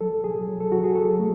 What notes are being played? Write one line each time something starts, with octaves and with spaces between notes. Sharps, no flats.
F#3 A4
F#3 G#4
F#3
A4
F#3 F#4
G#4
F#3 A4
A3